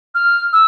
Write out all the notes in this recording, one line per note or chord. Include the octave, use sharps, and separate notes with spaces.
F6
E6